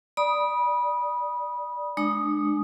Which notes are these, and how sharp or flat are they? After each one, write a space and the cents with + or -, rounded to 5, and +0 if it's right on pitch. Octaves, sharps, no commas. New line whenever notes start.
D5 +0 B5 -25 D#6 +0
G#3 +20 D4 +25 D#6 +0